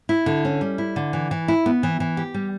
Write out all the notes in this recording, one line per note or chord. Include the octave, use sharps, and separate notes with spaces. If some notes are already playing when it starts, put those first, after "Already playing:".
E4
D3
C#4
G3
E4
D3
E3
E3
E4
B3
E3
E3
G4
G3